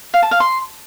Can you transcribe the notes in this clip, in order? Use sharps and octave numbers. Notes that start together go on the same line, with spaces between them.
F5
A5
F5
C6